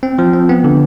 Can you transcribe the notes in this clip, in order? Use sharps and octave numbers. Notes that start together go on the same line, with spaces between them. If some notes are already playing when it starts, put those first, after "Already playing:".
C4
F3
C4
B3
D3